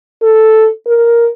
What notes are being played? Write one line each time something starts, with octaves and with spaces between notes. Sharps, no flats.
A4
A#4